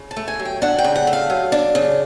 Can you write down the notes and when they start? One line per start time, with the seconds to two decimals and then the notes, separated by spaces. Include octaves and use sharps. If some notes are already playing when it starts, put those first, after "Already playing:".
Already playing: C#3
0.11 A5
0.17 A3
0.28 G#5
0.39 F#3
0.45 G5
0.62 D4 F#5
0.78 G5
0.84 C#3
0.96 F#5
1.07 A3
1.13 F5
1.30 F#3
1.52 D4
1.75 C#3